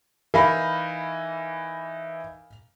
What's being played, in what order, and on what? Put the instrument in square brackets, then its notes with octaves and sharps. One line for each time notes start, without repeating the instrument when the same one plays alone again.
[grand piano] E3 D#4 [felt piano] A#4 F5 B5